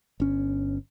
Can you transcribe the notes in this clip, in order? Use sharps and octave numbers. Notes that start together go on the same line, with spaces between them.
G1 C#4